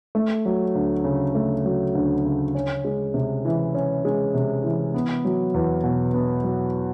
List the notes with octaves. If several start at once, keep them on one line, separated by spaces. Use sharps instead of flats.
A3
F#3
D2
C#3
A3
F#3
D2
C#3
C#4
G#3
C3
E3
C#4
G#3
C3
E3
B3
F#3
E2
B2
B3
F#3